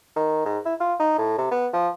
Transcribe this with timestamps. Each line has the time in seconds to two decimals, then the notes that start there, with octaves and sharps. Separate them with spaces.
0.16 D#3
0.45 G#2
0.65 E4
0.80 F4
0.99 D#4
1.18 A2
1.38 C3
1.51 B3
1.73 F3